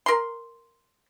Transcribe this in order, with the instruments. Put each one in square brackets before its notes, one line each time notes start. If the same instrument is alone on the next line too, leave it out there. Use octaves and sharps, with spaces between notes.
[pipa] A#4 C6